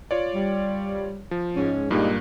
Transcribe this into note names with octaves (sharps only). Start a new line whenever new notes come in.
F4 C#5 D5
G3
F3
G#2 G#3 C#4
G2 A#2 G3 G#3 A#3 D#4